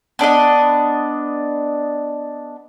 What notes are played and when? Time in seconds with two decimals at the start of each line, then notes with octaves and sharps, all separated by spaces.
0.19 B3 D4 A4 D#5